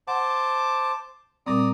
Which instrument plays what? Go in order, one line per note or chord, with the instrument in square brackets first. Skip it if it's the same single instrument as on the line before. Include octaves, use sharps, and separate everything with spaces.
[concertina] C5 A5 D6 [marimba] F#5
[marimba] A#2 G3 C4 [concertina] D5 A#5 D#6